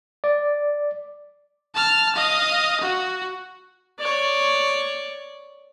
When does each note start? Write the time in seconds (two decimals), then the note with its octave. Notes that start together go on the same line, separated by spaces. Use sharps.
0.24 D5
1.74 A5 F6
2.16 D#5 F5
2.81 F#4
3.99 C#5 D5